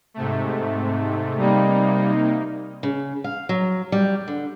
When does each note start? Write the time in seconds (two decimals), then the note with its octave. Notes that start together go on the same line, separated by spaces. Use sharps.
0.14 G#2 C3 A3
1.38 C3 G3 A#3 D#4
2.83 C#3
3.24 F5
3.49 F#3
3.92 G3
4.28 D3